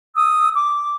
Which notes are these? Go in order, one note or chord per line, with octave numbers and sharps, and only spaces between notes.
D#6 E6
D6